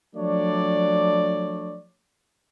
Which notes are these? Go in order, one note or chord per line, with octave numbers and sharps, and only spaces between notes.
F3 F#3 A3 D4 C#5 D5